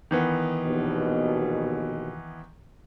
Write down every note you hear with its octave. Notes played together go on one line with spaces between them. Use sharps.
D#3 E3 B3
A#1 D#2 B2